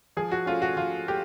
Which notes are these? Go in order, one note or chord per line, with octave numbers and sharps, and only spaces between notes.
F3 G#4
F#4
A3 C#4 F4
F#4
F3 F4
A3 G4